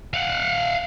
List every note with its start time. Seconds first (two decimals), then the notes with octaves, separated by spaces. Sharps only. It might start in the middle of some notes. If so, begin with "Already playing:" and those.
0.14 F5 F#5